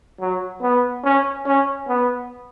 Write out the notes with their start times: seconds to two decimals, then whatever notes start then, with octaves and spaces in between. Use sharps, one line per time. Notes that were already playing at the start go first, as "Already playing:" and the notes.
0.21 F#3
0.62 B3
1.04 C#4
1.46 C#4
1.88 B3